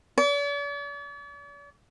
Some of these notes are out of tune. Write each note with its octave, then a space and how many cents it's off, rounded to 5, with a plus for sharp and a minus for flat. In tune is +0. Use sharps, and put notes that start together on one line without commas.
D5 -45